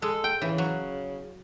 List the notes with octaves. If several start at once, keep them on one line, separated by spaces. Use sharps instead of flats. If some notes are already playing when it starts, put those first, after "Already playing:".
G#3 A4
G5
C#3 E3
F#3